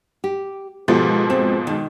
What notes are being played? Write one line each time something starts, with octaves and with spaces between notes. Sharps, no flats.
G4
G#2 B2 F3 B3 G4 A4
C4
D#3